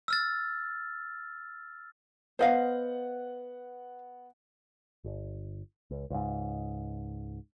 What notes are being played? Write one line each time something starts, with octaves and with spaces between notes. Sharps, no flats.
E6 F6 A6
B3 C5 D#5 F5 F#5
G1
C#2
C#2 G#2